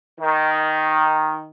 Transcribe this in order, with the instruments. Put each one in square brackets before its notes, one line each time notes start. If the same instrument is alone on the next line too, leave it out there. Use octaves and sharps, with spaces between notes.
[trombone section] D#3